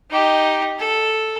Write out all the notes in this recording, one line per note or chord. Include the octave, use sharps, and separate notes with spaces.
D#4 G4
A4